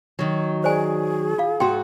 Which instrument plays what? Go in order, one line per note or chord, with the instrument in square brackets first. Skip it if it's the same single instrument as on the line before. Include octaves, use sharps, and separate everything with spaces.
[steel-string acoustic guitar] D#3 F#3
[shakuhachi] G#4 [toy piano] C5 D5 G#5
[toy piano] F4 F5
[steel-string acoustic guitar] G#2 F#4 [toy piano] G5 C6